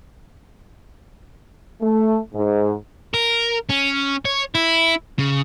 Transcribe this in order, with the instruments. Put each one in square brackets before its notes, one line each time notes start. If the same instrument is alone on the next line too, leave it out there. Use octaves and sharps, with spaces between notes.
[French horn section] A3
G#2
[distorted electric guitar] A#4
C#4
C#5
E4
C#3